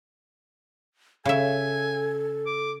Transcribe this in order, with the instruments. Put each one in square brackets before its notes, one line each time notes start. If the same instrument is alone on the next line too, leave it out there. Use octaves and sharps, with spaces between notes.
[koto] C#3 E5 [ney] A4 [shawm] G#5
[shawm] D6